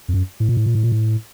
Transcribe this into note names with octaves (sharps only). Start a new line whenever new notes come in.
F2
F#2
A2
A#2
A2
A#2
A2
A#2
A2